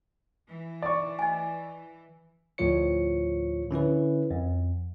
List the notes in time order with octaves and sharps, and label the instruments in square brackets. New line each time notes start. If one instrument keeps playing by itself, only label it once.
[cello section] E3
[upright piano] D5 C#6
[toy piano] D#5 G#5
[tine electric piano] D2 A2 F3 F4 C#5 C#7
D3 C#4 E4 B4
F2